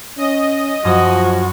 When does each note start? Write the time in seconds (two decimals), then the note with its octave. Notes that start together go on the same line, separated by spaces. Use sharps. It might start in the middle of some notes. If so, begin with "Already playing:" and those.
0.18 C#4 D#5
0.85 F#2 F3 F#4 D#6